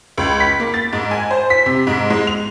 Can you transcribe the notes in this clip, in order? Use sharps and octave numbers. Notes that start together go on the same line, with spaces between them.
C#2
B6
A#3
A6
G#2
G#5
C5
B6
C3
G#2
G#3
F7